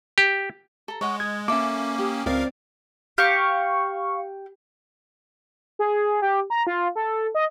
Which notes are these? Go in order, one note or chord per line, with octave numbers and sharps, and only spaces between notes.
G4
A4 A#5
G#3 C#5 D#5 F#5
D#6 G#6
A#3 C#4 A4 E5 D6
G4 D#6
C#2 C4 A#4 D5 F5
G4 F5 C#6
G#4
G4
A#5
F4
A4
D#5